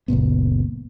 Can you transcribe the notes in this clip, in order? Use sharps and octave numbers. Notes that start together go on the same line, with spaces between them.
F#1 C#2 A#2 B3